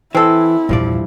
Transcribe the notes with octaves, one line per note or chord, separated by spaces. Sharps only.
E3 C4 E4 A4
A#1 E2 G2 F3 D5